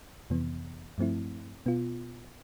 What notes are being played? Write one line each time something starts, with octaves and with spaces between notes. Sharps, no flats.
F2 C3 E3 B3
G2 F3 A3 C4 E4
B2 B3 F4